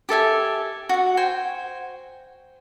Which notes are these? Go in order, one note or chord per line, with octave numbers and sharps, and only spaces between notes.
G4 A4 E5 G#5
F#4 F#5
C5 G5 G#5